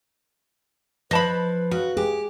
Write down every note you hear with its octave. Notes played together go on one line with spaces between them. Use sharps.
F3 B4 D#5 A5 B5
C#3 F#4
G4 G#4